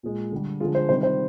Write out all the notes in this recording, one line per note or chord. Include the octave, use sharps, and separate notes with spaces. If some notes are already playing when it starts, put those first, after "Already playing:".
A#2 G#3
D3 G3
D3 F3 G#3 F4
C5
C3 D#3 G3 C5
C5